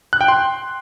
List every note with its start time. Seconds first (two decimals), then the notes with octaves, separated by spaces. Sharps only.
0.13 F#6
0.21 G5
0.28 C6